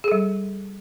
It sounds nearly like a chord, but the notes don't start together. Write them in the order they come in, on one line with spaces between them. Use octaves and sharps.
G#4 A4 G3